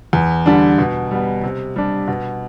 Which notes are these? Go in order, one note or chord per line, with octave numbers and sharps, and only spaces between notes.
E2
D3 G3 D4
B2
G3 B3
C3
G3 D4
B2